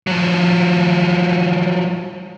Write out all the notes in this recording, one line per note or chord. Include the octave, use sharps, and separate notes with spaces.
F3 F#3